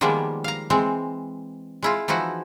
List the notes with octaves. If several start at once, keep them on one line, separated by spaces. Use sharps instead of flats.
D#3 F3 G3 G#3 A#3 B3
F5 A#5
E3 G#3 C4
G#3 E4 F4
E3 F3 D#4 E4 F#4